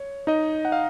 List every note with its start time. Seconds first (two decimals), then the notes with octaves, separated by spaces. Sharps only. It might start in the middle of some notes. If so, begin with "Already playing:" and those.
Already playing: C#5
0.27 D#4 D#5
0.65 F#5
0.72 F5